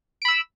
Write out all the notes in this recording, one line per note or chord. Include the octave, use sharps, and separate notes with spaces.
B5 E6 D7